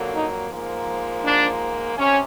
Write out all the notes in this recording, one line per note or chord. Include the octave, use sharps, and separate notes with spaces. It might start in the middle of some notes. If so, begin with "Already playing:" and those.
Already playing: F2 D3 F#3 A#3
D#4
G#2 F3 A#3
D4
C3 C#4